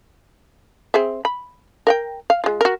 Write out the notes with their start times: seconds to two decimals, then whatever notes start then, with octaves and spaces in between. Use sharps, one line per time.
0.94 C4 G#4 E5
1.25 B5
1.87 A#4 F#5 G5
2.30 F5
2.44 G#3 F4
2.61 F#4 A#4